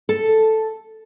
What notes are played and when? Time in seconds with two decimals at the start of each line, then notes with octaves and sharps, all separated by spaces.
0.09 A4